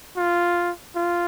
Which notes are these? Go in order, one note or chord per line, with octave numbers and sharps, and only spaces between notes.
F4
F4